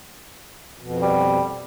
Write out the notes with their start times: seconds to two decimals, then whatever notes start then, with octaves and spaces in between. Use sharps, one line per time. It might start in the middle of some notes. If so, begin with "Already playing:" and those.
0.80 F2 B2
1.02 G3